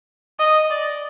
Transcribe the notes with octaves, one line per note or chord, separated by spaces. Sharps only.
D#5
D5